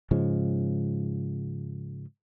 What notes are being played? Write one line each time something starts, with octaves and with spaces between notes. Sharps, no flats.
G#2 C#3 F3 G#3